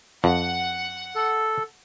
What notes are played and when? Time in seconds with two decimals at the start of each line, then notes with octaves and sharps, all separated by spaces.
0.24 F2 F#5
1.15 A4